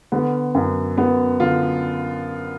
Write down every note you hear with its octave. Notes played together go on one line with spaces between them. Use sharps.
D3 B3
F#2
F#2 B3
D3 F4